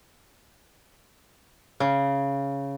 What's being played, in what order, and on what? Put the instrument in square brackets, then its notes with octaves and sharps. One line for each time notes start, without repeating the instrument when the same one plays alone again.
[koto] C#3